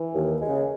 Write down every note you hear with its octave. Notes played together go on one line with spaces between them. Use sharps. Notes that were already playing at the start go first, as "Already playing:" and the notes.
Already playing: E3
D#2
C#3 G#3